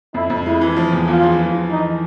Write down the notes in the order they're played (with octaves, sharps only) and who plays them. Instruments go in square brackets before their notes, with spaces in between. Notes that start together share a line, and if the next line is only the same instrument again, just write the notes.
[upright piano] F2 [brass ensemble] E4
[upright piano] F2
[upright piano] G#3 [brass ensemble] E4
[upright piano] E3
F3
E2
[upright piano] E2 [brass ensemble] F4
[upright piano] F3
E3
E3
[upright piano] E3 [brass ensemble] D#4